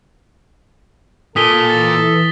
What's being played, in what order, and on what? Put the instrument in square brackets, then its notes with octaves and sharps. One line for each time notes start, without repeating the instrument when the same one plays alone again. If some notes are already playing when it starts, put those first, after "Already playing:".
[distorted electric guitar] A#2 [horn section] A4 [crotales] D#6 B6 G7
[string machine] E3 [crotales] A6